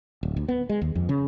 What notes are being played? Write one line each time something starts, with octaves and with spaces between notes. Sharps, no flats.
D1
D2
B3
G#3
D#2
F2
C#3